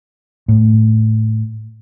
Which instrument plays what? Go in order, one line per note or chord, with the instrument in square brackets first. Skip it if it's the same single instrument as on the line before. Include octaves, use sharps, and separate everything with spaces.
[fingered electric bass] A2